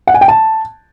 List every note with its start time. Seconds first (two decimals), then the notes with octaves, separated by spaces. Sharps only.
0.07 F#5
0.14 G#5
0.21 G5
0.28 A5